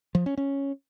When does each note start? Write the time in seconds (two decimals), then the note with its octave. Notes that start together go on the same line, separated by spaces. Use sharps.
0.15 F3
0.26 C#4
0.38 C#4